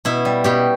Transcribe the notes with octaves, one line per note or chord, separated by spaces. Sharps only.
B2 E4
G3
B2 G4